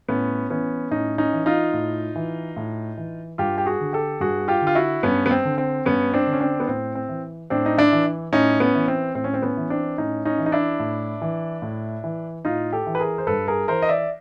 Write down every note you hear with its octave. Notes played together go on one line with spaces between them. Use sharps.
A2 B3 C#4
E3 B3 C#4
A2 C#4 D#4
C#4 D#4
E3
D#4 F4
A2
E3
A2
E3
G2 F4 G4
G4
F#4 G#4
D3
G4 A4
G2 F#4 G#4
F4 G4
D3
F4
E4 F#4
G2 B3 C#4
B3
C4
D3
C4
G2 B3 C#4
C4 D4
D3
C#4
C4 D4
B3
A2 C4
C4
E3
A2 C4 D4
D#4
D4 E4
E3
A2 C#4 D#4
B3 C#4
E3
C4
A2 C4
C#4
C4
B3 C#4
E3
C4 D4
A2 C#4 D#4
C#4 D#4
E3
D#4
D4 E4
A2
E3
A2
E3
A2 D#4 F4
G4 A4
E3
B4
G#4 A#4
C5
G2 A4 B4
G#4 A#4
E3 A#4 C5
D#5
D5 E5